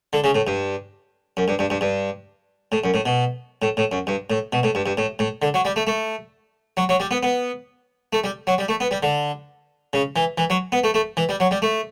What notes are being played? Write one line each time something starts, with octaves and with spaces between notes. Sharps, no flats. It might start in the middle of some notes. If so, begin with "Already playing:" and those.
D3
C#3
A2
G2
F#2
G2
G2
G2
G2
A2
F#2
A2
B2
A2
A2
F#2
G2
A2
B2
A2
G2
G2
A2
A2
D3
F#3
G3
A3
A3
F#3
F#3
G3
B3
B3
A3
G3
F#3
G3
A3
B3
G3
D3
C#3
E3
E3
F#3
B3
A3
A3
E3
G3
F#3
G3
A3